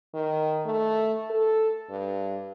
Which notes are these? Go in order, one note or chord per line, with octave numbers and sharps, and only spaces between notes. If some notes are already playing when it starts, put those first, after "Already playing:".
D#3
A3
A4
G2